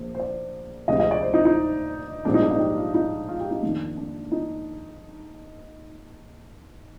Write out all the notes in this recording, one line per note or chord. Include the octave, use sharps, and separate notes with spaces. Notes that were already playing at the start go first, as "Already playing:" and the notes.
Already playing: A#1 A#2 C5
C5
D5
D2 C3 F3 G#3 C4 D#5
D#5
D5
C5
D#4
D#4
A#1 G#2 G3 C4 D4
D#4
D4
D#4
G4
F4
D#4
F4
G4
D#4
F2 D#3 A#3 D4
D4
D#4